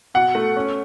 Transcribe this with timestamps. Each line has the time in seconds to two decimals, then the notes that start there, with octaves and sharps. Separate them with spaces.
0.14 B2 F#5
0.35 A3
0.56 C#4